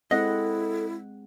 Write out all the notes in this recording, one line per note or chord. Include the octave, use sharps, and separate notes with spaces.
G#3 C4 E4 A4 D#5 F#5